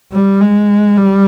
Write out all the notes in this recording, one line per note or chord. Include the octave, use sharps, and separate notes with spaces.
G3
G#3
G3